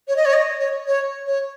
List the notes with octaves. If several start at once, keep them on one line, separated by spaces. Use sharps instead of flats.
C#5
D#5
C#5
D#5
C#5
C#5
C#5